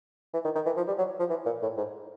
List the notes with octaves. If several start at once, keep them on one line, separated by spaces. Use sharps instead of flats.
E3
D#3
D#3
E3
F3
G3
F#3
F3
E3
A#2
A2
G#2